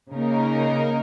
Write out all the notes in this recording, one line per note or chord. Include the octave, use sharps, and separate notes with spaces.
C#3 A#3 D#4 A#4